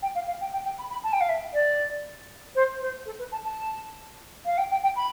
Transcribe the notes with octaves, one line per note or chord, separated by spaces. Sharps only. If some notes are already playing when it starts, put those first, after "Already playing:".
G5
F5
F5
G5
G5
G5
B5
B5
A5
G5
F5
E5
D5
C5
C5
A4
B4
A5
A5
F5
G5
G5
G5
B5